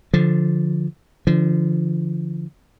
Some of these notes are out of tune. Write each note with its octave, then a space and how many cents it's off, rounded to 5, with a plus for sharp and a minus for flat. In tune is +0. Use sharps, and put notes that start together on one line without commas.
D3 +0 F3 +0
D3 +0 F3 -30